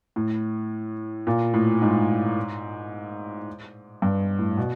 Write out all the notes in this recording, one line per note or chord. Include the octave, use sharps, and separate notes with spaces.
A2
A#2
A2
G#2
G2
A2
B2